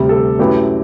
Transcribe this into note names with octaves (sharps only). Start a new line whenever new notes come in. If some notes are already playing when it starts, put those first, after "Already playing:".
Already playing: D2 C3 G3 G4
A4
F#2 F#3 A3 E4 G4 B4